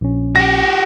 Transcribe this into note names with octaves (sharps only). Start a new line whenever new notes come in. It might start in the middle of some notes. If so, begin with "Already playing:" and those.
A#1 C#4
F#4 G4 A#6